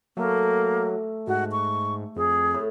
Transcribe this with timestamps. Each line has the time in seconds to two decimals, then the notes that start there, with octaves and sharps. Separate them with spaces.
0.17 F#3 A3 A#3
1.27 G#2 F#4
1.52 C#6
2.16 F2 G#4
2.54 A2